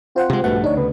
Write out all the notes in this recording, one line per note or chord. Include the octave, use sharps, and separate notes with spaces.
C4 F4 C5 F#5
C3 G#3
A#1 G2 B2 A3 F#5
D2 D4 D#4 C#5
C#3 B3